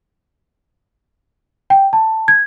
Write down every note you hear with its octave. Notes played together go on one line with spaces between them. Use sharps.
G5
A5
G#6